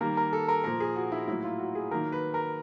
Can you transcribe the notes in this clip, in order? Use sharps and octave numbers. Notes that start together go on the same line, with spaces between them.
D#3 G3 A#3 A#4
A#4
A4
A#4
A#2 F3 A#3 A#4
G#4
F#4
E4
A2 F#3 A#3 E4
F4
F#4
G#4
D#3 F#3 A#3 A#4
B4
A#4